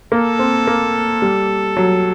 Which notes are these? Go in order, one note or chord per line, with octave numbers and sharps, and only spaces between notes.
A#3 A4
C4
A#3
G3
F#3